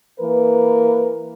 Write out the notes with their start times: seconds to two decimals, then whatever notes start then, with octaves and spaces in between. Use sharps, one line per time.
0.20 E3 A#3 A#4 B4